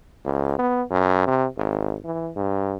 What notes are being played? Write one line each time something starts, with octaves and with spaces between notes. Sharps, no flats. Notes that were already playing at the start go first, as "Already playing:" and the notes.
C#2
B3
F#2
C3
G#1
E3
G2